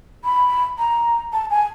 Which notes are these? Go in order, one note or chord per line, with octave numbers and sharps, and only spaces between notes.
B5
A#5
A5
G#5